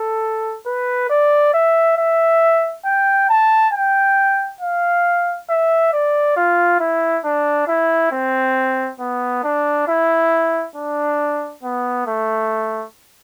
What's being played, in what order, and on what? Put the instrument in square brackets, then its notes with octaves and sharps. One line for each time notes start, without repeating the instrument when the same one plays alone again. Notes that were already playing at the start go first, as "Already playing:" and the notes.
Already playing: [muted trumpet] A4
B4
D5
E5
E5
G5
A5
G5
F5
E5
D5
F4
E4
D4
E4
C4
B3
D4
E4
D4
B3
A3